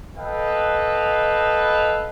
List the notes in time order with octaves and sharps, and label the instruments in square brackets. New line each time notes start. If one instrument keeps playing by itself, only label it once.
[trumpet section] A4 B4 D#5 F5 G5